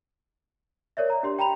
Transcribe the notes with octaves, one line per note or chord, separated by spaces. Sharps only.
A#4 C#5 D5 E5
A#5
D4 G4 C6
G5 A#5 B5 F7